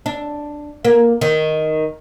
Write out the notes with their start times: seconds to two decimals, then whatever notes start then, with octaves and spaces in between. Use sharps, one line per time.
0.06 D4
0.85 A#3
1.21 D#3